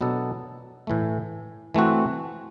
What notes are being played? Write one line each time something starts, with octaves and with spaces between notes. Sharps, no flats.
B2 F#3 B3 D4 A4
A2 E3 A3
E3 A3 C4 F#4